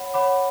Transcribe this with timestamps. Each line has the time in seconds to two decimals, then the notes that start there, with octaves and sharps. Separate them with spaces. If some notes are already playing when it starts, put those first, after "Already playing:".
Already playing: C#5 F#5 B5
0.14 C#5 F#5 B5 D6